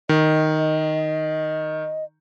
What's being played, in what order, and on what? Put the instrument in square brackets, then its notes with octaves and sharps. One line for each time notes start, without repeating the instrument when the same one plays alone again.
[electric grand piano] D#3 [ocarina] D#5